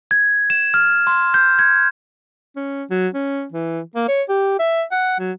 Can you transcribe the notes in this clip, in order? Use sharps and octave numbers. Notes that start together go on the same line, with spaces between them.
G#6
E7
F6
C6
G6
G#6
C#4
F#3
C#4
E3
A#3
C#5
G4
E5
F#5
F#3